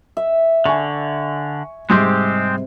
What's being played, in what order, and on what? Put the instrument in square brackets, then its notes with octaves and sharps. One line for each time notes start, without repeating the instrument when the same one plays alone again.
[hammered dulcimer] E5
[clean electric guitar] D3 [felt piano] G#5 C#6
[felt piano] G#2 G3 C6 [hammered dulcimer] C3 [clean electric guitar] G#3 C4 G4